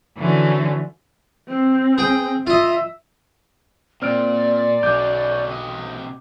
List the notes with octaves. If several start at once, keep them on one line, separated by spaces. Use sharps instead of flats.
D3 E3 F#3 A3 C#4
C4
G#4 G5
F4 D#5 E5
A#2 C4 D5 F6 D7
B1 B2 C#4 D6 G6
C3 D#5